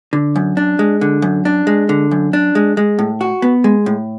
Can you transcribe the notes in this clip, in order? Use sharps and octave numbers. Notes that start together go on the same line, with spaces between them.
D3
F#2
D4
G#3
D3
F#2
D4
G#3
D3
F#2
D4
G#3
G#3
A2
F#4
B3
G#3
A2